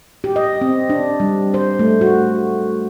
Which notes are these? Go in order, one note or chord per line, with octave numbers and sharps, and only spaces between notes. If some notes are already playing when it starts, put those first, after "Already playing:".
G4
D#5
C4
D4
G3
C5
A3
F#4